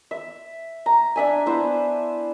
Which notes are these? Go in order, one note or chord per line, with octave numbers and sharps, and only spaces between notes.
E5
A#5
D4 E5 G#5
B3 E4 C5